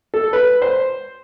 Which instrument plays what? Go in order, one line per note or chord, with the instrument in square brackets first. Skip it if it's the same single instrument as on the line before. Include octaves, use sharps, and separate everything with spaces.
[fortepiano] A4
B4
C5